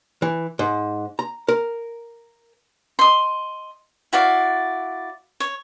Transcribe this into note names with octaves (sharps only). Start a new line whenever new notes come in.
E3
G#2
A#5
A#4
D#5 C6
E4 F#4 D5 F5
C#5